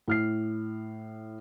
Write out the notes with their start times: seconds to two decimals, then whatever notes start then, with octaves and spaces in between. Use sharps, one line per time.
0.08 A2 F6 C7